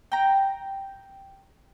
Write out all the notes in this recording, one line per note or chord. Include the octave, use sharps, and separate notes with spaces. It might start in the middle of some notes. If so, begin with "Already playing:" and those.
G5 A#5